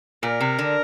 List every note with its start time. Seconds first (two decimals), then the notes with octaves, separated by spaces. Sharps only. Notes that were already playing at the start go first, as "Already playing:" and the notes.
0.22 A#2 A#4
0.41 C3
0.59 D3